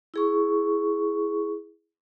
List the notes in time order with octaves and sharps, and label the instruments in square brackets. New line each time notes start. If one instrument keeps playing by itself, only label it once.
[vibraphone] E4 G#4 C#6